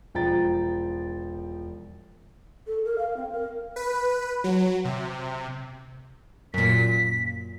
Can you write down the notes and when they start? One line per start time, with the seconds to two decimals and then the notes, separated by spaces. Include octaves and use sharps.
0.14 E1 F3 G5 A#5 A6
2.67 A4
2.85 A#4
2.98 F5
3.17 C4
3.32 A#4
3.76 B4
4.44 F#3
4.85 C3
6.54 F#2 A#2 B6